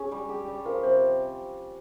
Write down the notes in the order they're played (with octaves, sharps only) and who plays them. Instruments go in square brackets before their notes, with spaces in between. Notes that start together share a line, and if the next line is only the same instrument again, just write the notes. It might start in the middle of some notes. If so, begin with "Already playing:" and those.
Already playing: [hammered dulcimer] C#4 [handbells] G#4
[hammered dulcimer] G3
[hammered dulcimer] G4 [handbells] G#4
[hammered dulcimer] G3
[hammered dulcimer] F3 [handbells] A#4
[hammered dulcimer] C3 [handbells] C5